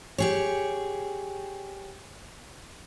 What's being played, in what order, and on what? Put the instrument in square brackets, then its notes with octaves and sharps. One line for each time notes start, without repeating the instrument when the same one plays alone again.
[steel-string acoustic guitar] G4 G#4 C#5